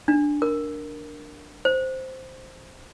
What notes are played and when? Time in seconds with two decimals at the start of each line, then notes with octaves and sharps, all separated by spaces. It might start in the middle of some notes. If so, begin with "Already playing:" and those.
0.08 D4
0.42 A#4
1.65 C5